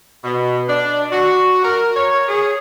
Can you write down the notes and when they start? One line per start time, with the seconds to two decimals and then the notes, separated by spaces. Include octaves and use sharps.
0.24 B2
0.67 D4
1.11 F#4
1.63 A#4
1.96 C#5
2.28 G#4